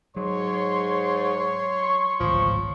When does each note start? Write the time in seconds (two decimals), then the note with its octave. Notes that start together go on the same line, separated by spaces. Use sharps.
0.17 G#2 F#3 C#5 C6
1.81 C#6
2.20 D1 G#1 C#2 F3